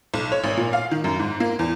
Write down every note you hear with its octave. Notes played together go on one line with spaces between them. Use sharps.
B1
C#5
G#1
A#2
F5
D#3
F#2
G#2
A#3
E2